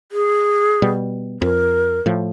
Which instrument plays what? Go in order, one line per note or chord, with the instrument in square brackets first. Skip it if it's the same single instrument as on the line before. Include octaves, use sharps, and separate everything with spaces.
[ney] G#4
[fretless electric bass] B2 G3
[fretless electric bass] F2 [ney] A#4
[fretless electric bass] A2 F3